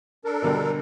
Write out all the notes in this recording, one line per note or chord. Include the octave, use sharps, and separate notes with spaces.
D4 A4 A#4
B2 D3 G3